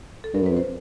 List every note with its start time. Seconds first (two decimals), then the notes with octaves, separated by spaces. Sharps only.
0.24 A4
0.34 G2 A#4
0.43 F#2 B4
0.51 F2
0.57 C5